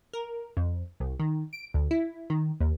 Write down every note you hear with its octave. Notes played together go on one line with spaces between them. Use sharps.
A#4
F2
C2
D#3
D7
D2
E4
D#3
D#2